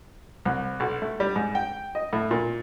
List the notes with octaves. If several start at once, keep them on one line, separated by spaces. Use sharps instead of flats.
C2
B1
A3
G3
G#2
G5
D#5
A2
A#2